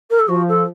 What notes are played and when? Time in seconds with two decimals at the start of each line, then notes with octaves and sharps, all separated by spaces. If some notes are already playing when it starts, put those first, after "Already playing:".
0.10 A#4
0.19 A4
0.28 F3 F#4
0.48 A4